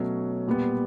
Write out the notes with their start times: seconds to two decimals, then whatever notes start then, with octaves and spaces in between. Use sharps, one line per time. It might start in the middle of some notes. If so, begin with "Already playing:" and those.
Already playing: B2 F#3 A3 C#4
0.47 A#2 G3 B3